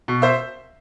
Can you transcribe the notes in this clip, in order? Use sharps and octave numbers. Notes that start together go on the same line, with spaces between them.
B2
C5 E5